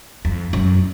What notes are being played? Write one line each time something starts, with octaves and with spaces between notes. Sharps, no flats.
F2
F#2